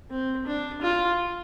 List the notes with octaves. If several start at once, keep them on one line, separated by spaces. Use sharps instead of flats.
C4
D4
F4